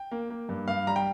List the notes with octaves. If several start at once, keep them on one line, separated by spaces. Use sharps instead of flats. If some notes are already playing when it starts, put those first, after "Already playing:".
Already playing: G5
A#3
A#3
G2
G2 F5
G3 A#5
G5